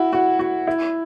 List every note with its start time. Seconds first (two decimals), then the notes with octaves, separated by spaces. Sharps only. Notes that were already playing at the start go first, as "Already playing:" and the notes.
Already playing: E4 F#4
0.13 F#4
0.39 F#4
0.67 E4